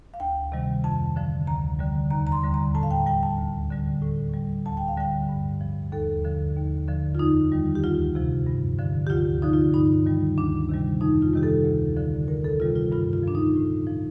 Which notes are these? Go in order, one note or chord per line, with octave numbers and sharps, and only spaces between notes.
F5
D2 G5
C3 D#3 G3
F2 A5
D3 F3
D2 A#5
D3 G3
D#2 A#5
A#5
C6
D3 G3
A#5
A2 A5
F5
G5
G3 G5
A5
D2
D3 G3
A2
G3
D2 A5
G5
F5
D3 G3 G5
G2
F3
D#2 A4
D3 F3
D#2
D3 F3
F4
F2 D#4
D#3 G3
G4
D2 F4
C3 F3
G2
D3 F3
G4
D2 F4
D3 F3 D#4
F4
G2 D#4
D#3 G3
D2 D4
C3 D#3 G3
F2 D#4
F4
C3 D#3 G3 G4
A4
D2
D3 F3
D2 A#4
A4
C3 D#3 G3 F4
F4
G2 F4
F4
F3 D4
D#4
A2
F3